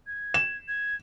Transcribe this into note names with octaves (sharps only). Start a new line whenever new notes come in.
G#6
E7
G#6